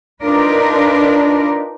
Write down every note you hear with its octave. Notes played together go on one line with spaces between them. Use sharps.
D4 D#4 F4 A#4 B4 D5